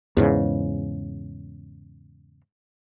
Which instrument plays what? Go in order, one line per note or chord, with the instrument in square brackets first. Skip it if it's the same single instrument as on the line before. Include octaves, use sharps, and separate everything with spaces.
[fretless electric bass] E2 G#2 C#3